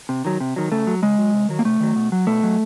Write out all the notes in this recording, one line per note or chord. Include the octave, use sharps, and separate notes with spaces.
C3
D#3 F#3
C3
D#3 F#3
C#3 A3
F#3
C#3 G#3
F#3
C3
D#3 F#3
A#3
C3 A3
D#3 F#3
B2
F#3
B2 A3
F#3